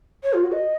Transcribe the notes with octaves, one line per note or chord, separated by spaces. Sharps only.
C#5
F4
F#4
D#5